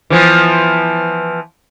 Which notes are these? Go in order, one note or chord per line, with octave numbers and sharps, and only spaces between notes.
E3 F3 B3